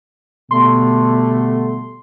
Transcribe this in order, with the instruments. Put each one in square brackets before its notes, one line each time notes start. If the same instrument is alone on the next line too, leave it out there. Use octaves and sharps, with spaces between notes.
[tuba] B2 [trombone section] D3 G3 A3 [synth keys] C6